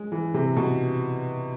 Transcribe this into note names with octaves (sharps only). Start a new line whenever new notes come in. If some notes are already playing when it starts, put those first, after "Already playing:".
Already playing: G#3
E3
C3
B2